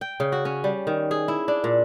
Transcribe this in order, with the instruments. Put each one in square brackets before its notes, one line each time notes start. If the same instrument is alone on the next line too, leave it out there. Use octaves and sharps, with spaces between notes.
[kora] G5
C#3
F#4
C#4
G3
D#3
G#4
E4
D4
A#2